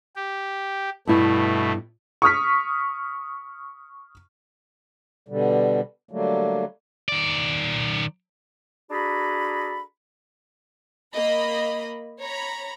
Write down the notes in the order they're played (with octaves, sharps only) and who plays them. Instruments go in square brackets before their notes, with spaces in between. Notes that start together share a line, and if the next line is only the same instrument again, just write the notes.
[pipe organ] G4
[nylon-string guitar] G2 E4 [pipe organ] B2 A3
[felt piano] C#6 D#6 F6 B6
[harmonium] B2 D3 G3
D3 F#3 G3 A3 A#3
[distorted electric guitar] D#3 D5
[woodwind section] D4 F#4 G#4 A4 A#5 B5
[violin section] A#3 D#5 B5
C#5 A#5 B5